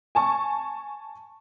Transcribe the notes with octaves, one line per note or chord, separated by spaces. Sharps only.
G#5 A5 C#6